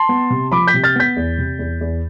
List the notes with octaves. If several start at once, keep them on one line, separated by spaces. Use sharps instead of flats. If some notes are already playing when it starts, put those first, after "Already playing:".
Already playing: A5 C6
B3
C3
F3 B5 D6
G6 B6
C3
F6 A6
B3 G6 B6
E2
C3
E2
E2